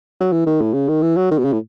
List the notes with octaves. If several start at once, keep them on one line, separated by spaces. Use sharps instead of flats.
F#3
E3
D#3
A2
C#3
D#3
E3
F#3
D#3
B2
C#3
A2